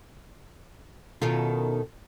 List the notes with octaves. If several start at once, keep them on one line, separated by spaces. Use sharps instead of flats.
B2 D#3 C#4 E4 F4 A4